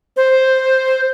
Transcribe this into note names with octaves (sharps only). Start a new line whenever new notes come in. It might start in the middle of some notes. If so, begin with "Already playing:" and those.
C5